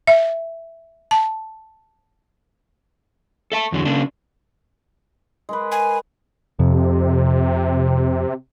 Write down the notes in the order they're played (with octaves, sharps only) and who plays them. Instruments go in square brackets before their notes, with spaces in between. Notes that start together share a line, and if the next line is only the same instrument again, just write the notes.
[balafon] E5
A5
[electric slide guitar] A4 E5 A5
E2 D3 F#3
C#3 A#3 D4
[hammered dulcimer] G#3 A#4 B4
[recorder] G#5
[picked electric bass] F2 [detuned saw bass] C3